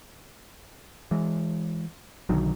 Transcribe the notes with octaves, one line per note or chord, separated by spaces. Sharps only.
E3 G#3
B1 D3 D#3 F#3